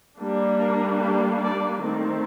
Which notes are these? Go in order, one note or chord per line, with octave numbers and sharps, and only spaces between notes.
G3 A#3 D4
A#4
G4
D5
D#3 A3 C4